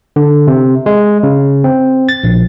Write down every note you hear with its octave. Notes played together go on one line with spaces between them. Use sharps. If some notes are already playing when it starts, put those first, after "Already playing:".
D3
C3
G#3
C#3
C4
A6
A#1